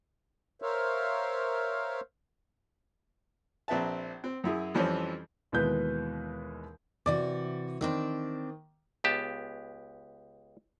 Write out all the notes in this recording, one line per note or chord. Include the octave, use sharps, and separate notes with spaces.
A#4 C5 C#5 E5 F5
A#1 C4 B4 E5 A5
C4
F#2 E4 G#4
F2 E3 F3 G3 C4 C#4
D#2 B2 E3 G#3 B4 G6
C3 E3 F#4 D5
D#3 C4 D4 D5
C#2 B3 G4 A5